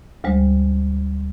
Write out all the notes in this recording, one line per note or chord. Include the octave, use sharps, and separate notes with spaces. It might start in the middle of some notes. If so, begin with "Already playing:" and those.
D2 G3 G#3 C5